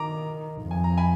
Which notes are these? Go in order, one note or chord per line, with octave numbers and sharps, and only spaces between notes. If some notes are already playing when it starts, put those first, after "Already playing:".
Already playing: D#3 A#5 D6
F2
G#5
A#5
G#5 B5